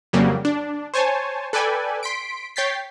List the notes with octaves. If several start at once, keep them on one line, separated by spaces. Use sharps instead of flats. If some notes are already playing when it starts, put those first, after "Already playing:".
F2 C#3 F#3 G3 A#3
D4
C5 C#5 G#5 A5
A4 B4 D5 G5 G#5
C6 B6 D7
C#5 G5 G6 A6 B6 C7